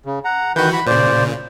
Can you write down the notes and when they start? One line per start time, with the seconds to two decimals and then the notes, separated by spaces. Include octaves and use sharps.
0.06 C#3
0.25 F#5 A#5
0.56 D#3 E3 F#4 B4 G6
0.73 B5
0.87 A#2 C#3 C5 D5